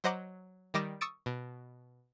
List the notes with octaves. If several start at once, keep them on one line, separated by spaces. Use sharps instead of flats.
F#3 C5 D#5 F#5 A#5 D6
D#3 G3 D#5 D6 A#6 E7
C#6 D#6 E6 A6 D7
B2